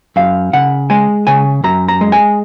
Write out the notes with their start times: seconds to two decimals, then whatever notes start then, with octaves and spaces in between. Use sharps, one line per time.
0.16 F#2 F5
0.53 C#3 F#5
0.90 G#3 G#5
1.27 C#3 G#5
1.64 F#2 A#5
1.88 A#5
2.01 G#3
2.12 G#5